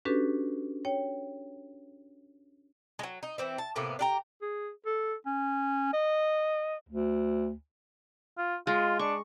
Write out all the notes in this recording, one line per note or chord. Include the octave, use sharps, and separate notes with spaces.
C#4 D4 F#4 G4 A4 B4
C#5 G5
F#3 G#3
D#4
E3 C4 E4
A5
A2 C3 A#3 B3
D4 G4 A#5
G#4
A4
C#4
D#5
D2
F4
G#3 F4
D4 C#6